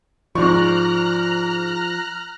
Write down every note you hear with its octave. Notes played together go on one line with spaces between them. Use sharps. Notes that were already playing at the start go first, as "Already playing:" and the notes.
G#2 F3 D5 A#5 C#6 F6 F#6